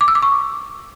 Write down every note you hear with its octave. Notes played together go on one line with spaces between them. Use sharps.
D6
E6
D6
C#6